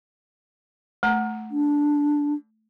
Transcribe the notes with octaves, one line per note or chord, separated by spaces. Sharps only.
A3 A#5
D4